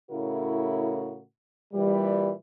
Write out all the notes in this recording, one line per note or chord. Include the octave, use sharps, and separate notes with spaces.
A2 C#3 E4 F#4 A#4
A#2 E3 G3